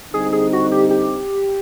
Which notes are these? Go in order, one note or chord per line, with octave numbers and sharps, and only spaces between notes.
D3 G3 C4 D#4 G#4
G#4
F#4
G4
G4